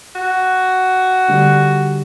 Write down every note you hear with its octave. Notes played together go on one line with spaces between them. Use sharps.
F#4
D3 G3